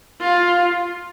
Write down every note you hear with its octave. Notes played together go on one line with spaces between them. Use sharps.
F4